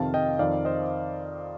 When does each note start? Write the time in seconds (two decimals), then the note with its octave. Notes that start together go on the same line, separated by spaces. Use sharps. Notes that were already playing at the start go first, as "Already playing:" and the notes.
Already playing: F2 C3 D#3 F5 A5
0.14 D#5 G5
0.39 F2 D#3 D5 F5
0.65 C5 D#5